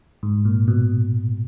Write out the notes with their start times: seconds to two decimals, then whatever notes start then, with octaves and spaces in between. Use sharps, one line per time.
0.23 G#2
0.45 A#2
0.68 B2